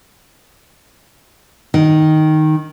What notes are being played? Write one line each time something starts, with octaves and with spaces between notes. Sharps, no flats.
D#3